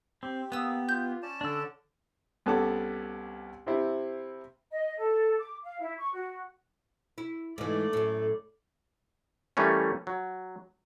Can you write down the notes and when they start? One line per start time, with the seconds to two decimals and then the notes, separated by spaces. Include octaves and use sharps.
0.23 C4 G4
0.52 A#3 B3 D#6 E6
0.88 F4 G6
1.23 C#4 D5 A5
1.41 D3 D4 E6
2.46 C2 B3 C#4 A4 A5 D6
3.67 C3 C4 E4
4.71 D#5
4.98 A4
5.39 D6
5.62 F5
5.80 E4
5.98 C#6
6.13 F#4
7.18 E4
7.58 G#2 E3 A3 D5
7.93 F#2 A2
9.57 E3 G3 A3 A#3 C#4
10.07 F#3